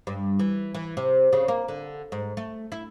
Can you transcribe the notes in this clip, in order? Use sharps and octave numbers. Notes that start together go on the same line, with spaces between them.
G2
E3
E3
C3
C#3
A#3
D3
G#2
A3
E4